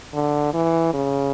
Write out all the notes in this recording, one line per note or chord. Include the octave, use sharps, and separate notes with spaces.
D3
E3
C#3